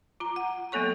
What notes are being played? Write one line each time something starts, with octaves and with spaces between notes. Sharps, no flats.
F4 A#5
F#5
F#3 A#3 B3 A4 C#5 C#6